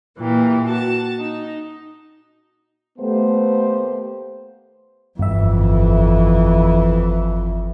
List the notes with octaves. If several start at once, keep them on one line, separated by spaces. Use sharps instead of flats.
A#2 E3 G4
F#4 A5
D#4
D#2 A3 B3 G4 C5
G1 F2 E3 E5